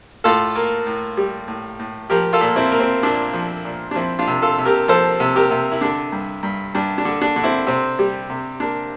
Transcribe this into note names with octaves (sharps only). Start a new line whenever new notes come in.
A2 F4 A4
A#3
A2
G3
A2
A2
F3 G4 A#4
F4 A4
A#2
C4 E4
A#3
C4
A#2 D4
F3
A#2
D4
F3 C4 E4
D4 F4
C3
F4 A4
C3
G4 A#4
F3 A4 C5
C3
G4 A#4
C3
E4
D3 D4
G2
G2
G2 D4
D4
D3
D4
D3
C4 E4
C3 C4
G3
C3
A#3 D4